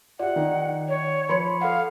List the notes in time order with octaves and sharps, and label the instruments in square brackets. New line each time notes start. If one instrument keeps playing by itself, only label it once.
[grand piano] F4 G4 [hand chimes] D5 E5 [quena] F#5
[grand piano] D#3
[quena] C#5
[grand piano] F3 [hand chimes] B5 C6 C#7
[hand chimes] A4 F#5 [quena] F5